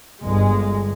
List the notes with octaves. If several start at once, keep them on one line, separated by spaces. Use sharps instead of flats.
G1 G#3